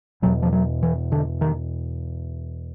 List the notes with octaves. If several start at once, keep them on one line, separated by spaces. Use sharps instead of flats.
E2 B2 F#3
F3
F#3
E3
D3
D#3